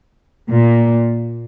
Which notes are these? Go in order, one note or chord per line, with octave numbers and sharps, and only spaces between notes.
A#2